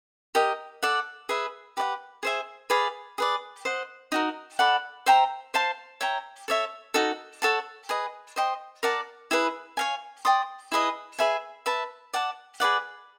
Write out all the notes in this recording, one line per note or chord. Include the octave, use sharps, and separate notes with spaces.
G4 A#4 D#5
A4 D5 F#5
G#4 B4 E5
G4 B4 D5 F#5
G#4 C5 E5 G#5
G#4 B4 D5 F5
G#4 B4 D5
C5 D#5 F#5
D#4 F#4 A#4
A4 D5 F#5 B5
C5 E5 G5 A#5
C5 F5 A5 C6
C#5 E5 G5 A#5
A4 C#5 E5
D#4 F#4 A4
A4 C#5 F#5 A5
G#4 B4 D#5
C5 D#5 G5 C6
A#4 D5 F#5 A5
E4 G#4 B4
C#5 F5 G#5
D5 G5 C6 D#6
E4 G#4 B4 D#5
G#4 B4 E5 G#5
B4 E5 A5
D5 F#5 A5
G#4 B4 D5 F#5